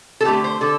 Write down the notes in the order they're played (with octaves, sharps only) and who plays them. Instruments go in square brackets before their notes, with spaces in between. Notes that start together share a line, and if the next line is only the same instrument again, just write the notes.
[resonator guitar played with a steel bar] A4
D3 A3 G4
C5
D3 A4